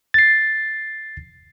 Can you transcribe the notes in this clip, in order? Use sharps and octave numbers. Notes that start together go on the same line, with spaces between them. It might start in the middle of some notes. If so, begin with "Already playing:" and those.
A6 C7